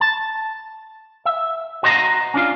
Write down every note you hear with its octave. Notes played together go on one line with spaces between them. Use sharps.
A5
E5
F#4 C5 D#5 A5 A#5
C#4 D4 F4